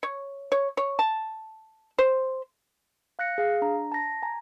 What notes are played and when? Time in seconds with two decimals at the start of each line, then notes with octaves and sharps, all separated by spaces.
0.03 C#5
0.52 C#5
0.77 C#5
0.99 A5
1.98 C5
3.19 F5 F#6 A#6 C#7
3.38 G#4 F5
3.62 D4 A#5
3.92 A5 A#6
4.23 G#5 A#5